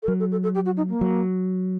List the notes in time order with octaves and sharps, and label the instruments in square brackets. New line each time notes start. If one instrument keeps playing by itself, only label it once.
[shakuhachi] A4
[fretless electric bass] F#3 [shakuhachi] A#4
[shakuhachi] A4
A4
A4
G4
F#4
D#4
A#3
[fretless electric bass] F#3